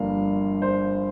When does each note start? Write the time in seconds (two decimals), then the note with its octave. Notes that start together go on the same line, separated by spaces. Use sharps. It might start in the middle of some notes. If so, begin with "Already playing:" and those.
Already playing: G1 G2 F3 A#3 D4 F5
0.62 C5